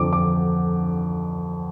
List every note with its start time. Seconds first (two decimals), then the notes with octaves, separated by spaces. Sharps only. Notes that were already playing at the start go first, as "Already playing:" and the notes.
Already playing: F2 D3 F3 D6
0.13 D6